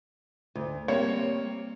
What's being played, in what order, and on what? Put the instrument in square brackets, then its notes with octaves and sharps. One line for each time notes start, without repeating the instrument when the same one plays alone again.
[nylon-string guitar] D2
[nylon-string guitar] G3 C4 [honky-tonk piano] A#3 [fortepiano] C#5